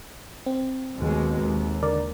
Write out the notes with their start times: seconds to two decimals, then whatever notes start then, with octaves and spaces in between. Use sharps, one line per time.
0.46 C4
0.97 D#2 B2 G#3
1.37 D#2
1.82 D3 A#4 D5